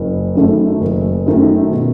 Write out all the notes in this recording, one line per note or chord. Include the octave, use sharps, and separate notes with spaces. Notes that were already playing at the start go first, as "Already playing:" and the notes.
Already playing: F#1
F#2 D#3 A3
F#1
F#2 D#3 A3
B2